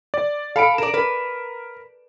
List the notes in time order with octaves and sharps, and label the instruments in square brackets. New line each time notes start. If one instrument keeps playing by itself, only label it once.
[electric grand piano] D5
[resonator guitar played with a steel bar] A4 [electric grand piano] F5 B5 D7
[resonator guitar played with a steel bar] A#4 D5 [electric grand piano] E7
[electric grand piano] A#4 [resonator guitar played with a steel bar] B4